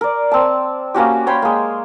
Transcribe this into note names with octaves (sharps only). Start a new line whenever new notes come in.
A#4 D5
C4 A5
A#3 C#4 F#4 G4
C#5 G5 B5 C6
G#3 A#3